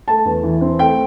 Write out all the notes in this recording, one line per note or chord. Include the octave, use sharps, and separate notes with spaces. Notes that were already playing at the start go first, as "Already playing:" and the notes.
A3 A5
E2
E3
C4
A3 G5